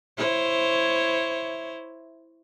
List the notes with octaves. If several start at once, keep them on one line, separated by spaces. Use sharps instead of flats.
E4 C5 C#5